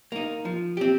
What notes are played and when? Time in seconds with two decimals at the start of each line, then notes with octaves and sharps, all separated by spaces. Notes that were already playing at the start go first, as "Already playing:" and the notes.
0.12 A#3 D#4
0.45 F3
0.77 C4 G4